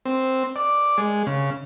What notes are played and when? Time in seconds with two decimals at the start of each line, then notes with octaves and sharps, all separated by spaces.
0.05 C4
0.56 D5
0.98 G#3
1.27 C#3